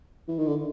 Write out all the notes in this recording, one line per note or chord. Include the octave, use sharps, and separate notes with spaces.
E3
D#3
D3